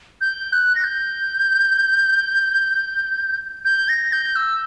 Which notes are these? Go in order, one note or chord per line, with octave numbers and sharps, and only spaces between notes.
G6
F#6
A#6
G6
G6
A#6
G6
E6